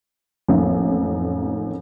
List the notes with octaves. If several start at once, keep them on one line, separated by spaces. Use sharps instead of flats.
A1 F2 D#3 A#3 D#4